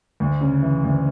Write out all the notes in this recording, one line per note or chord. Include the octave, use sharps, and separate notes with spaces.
D2
C#3
E3
D2